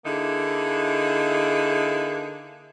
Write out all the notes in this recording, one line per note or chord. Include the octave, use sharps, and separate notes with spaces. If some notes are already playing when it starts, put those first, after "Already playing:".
D3 A#3 D#4 E4 G#4